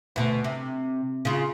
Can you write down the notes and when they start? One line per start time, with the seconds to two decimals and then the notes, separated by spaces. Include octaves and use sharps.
0.16 D2 B2
0.44 C3
1.25 C#3 F4